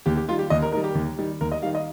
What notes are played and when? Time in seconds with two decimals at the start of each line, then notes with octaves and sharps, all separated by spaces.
0.06 D#2 G4
0.17 G4
0.28 D#3 G3 F4
0.39 G4
0.50 D#2 D#5
0.62 A#4
0.72 D#3 G3 A#4
0.84 G4
0.95 D#2
1.19 D#3 G3
1.41 D#2 A#4
1.52 D#5
1.62 D#3 G3 F5
1.75 D#5